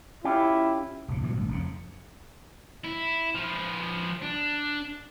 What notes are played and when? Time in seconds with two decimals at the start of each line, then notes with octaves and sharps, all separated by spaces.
0.24 C#4 E4 F4 G4
1.08 F1 A#1 C#3
1.22 A#2 E3 F#3 G3
1.35 G1 D2
1.48 F1 F2 C#3
2.85 E4
3.34 F3 B4
4.23 D4